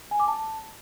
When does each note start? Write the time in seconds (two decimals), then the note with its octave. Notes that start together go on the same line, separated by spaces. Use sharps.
0.11 G#5
0.20 D6
0.28 A5